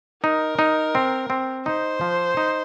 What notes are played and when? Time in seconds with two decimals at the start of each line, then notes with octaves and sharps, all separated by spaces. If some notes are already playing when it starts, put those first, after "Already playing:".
0.24 D#4 A#4
0.59 D#4
0.95 C4
1.30 C4
1.66 D#4 C5
2.01 F3
2.37 D#4